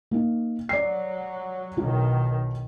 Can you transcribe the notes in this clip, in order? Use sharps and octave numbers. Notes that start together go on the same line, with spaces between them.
A#3 D#4
F#3 D5 C7
B1 D#3 F#3 E4 F4